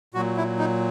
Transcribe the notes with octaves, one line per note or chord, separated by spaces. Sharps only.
A#2 F#3 F#4
E4
D#4